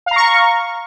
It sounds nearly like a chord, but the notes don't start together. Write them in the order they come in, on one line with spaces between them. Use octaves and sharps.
F5 A#5 C#6